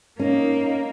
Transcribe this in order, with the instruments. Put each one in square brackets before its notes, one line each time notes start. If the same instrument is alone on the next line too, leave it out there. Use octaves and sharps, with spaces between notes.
[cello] A#3 [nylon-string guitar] C#4 [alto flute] D#4 [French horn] A#4